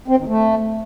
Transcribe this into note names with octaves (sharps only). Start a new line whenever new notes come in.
C4
D#3
A3